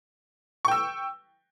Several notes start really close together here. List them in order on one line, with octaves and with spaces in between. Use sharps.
C#6 G5 E6